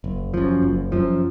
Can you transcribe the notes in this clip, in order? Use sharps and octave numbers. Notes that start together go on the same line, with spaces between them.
F#1
F#2 F3
F#1
F#2 F3